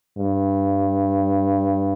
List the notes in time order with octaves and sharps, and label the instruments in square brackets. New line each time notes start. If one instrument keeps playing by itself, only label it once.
[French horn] G2